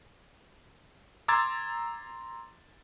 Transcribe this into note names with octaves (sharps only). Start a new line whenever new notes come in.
A#5 C6 D6 E6 G#6 A6